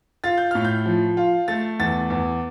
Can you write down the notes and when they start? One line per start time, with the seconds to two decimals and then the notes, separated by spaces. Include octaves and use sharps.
0.24 F4 A6
0.37 G6
0.51 A2 F6
0.65 G6
0.86 F3
1.17 F4
1.48 A3 A6
1.80 E2 A6
2.10 E2